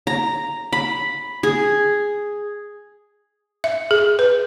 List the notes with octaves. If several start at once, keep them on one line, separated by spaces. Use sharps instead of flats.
A#5
B5
G#4
E5
G#4
B4